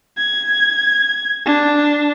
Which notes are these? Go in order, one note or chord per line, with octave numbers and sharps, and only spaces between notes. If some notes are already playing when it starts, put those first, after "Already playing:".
G#6
D4